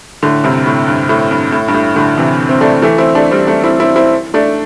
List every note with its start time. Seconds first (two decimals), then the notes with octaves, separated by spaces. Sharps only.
0.23 A2 D3
0.44 G2 C3
0.66 A2
0.88 G2
1.09 A2
1.31 G2
1.52 A2
1.68 G2
1.74 A2
1.96 A2 D3
2.18 C3 E3
2.49 C4
2.61 A3 D4
2.82 E3 A3
2.98 C4 E4
3.15 A3 D4
3.31 G3 C4
3.47 A3 D4
3.63 C4 E4
3.80 C4 E4
3.96 C4 E4
4.34 A3 D4